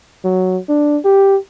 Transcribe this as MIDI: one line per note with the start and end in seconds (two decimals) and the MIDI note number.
0.25 0.58 54
0.69 0.98 62
1.05 1.37 67